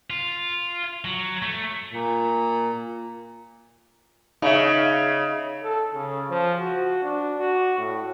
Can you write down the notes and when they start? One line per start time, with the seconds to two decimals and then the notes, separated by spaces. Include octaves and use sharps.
0.10 F4
1.05 F#3
1.42 A3
1.93 A#2
4.42 C#3 D#4 E5
5.63 A4
5.94 C#3
6.30 F3
6.59 F#4
7.03 D4
7.39 F#4
7.78 A2